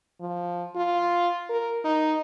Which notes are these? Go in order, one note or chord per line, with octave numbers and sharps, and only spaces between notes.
F3
F4
A#4
D#4